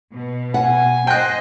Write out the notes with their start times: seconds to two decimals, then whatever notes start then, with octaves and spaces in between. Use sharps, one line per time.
0.14 B2
0.54 F#5 G#5
1.07 C5 D#5 G5 F#6